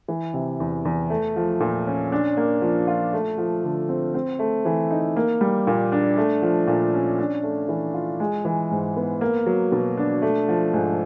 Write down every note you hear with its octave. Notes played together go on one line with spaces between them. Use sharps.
E3
C3
E2
E2
A3
F3
A#2
C#4
D4
A#3
F3
F4
A3
F3
D3
C4
C4
A3
E3
D#4
A#3
G3
A#2
D4
A3
F3
A#2
C#4
D4
A3
E3
F4
G#3
E3
G#2
B3
A#3
F#3
B2
D4
A3
F3
G#2